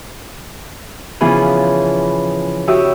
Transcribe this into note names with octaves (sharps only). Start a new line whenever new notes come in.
C#3 E3 F3 B3 G#4
F#4 G4 C#5 E5 D#6